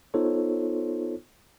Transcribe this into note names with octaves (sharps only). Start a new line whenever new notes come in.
B3 D#4 F4 A4 C5 C#5